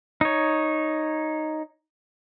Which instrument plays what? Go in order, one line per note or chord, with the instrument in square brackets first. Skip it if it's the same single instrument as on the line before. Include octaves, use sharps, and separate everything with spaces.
[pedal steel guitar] D#4 C#5